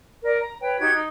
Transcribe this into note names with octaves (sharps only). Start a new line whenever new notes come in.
A#4 D5
A#5
B4 C#5 G5
D#4 F#4 G4 G#6
D#4